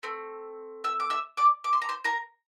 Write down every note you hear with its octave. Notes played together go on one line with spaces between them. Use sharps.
A3 C4
E5 E6
D6
E5 E6
D5 D6
D6
C6
A#5
C5 C6
A#4 A#5